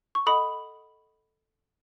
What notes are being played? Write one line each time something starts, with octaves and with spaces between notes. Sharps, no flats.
C#6
A4 D#5 F#5 B5 D#6